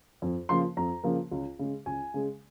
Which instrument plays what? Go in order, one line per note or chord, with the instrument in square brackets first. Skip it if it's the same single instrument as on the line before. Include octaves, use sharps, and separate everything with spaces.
[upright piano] F2
C#3 F3 A#3 C6
F2 A#5
C#3 F3 A#3
C#2
C#3 G#3
C#2 G#5
C#3 G#3